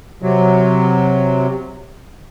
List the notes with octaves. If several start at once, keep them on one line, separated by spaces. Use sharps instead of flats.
C3 F#3